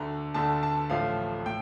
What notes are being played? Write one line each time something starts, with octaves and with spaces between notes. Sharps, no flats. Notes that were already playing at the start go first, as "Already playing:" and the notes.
Already playing: D2 D3 A3 A#5
D2 D3 A3 A5
A5
A1 A2 F3 A3 F5
A2 G5